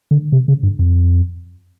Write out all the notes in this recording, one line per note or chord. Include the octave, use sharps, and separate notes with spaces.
D3
C3
C#3
G2
F2